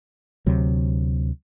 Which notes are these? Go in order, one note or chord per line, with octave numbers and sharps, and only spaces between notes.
D2 C3 F#3